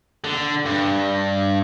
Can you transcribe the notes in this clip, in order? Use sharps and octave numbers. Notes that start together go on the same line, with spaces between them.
D3
G2